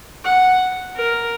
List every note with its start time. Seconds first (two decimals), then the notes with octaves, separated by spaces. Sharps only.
0.25 F#5
0.95 A#4